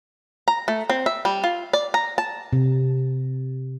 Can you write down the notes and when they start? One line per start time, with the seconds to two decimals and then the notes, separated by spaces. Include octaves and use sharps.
0.48 A#5
0.68 A3
0.90 C4
1.06 E5
1.25 G3
1.44 F4
1.73 D5
1.94 A#5
2.18 A5
2.53 C3